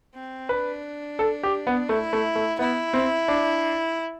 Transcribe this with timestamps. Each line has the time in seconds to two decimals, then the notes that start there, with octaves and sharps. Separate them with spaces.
0.15 C4
0.49 D4 B4
1.19 A4
1.43 G4
1.67 B3
1.89 A3 E4
2.13 A3
2.35 A3
2.59 B3 E4
2.94 C4
3.28 D4